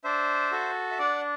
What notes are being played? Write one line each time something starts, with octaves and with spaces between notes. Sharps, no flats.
D4 C5 E5
F#4 A4
E5
D4 D5 F#5